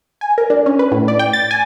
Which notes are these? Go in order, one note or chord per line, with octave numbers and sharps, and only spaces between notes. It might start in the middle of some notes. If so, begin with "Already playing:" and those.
G#5
A#4
D4
C#4
B4
A2
D5
G5
A6
G#5